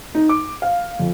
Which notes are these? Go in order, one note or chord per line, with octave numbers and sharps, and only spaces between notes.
D#4
D6
F5
F2